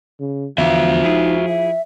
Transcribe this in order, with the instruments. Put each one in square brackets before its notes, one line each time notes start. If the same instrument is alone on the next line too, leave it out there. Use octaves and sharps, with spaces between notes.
[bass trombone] C#3
[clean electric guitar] E2 D3 B3 [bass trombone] F3 [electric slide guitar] F#4 E5 [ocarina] F5
[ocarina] D#4 [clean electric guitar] E4 G#4
[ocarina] E5